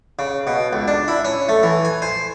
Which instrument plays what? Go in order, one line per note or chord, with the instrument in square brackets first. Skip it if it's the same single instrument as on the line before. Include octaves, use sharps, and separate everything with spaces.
[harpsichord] C#3
B2
C#2
D4
E4
C#4
A3
E3
G#5
C5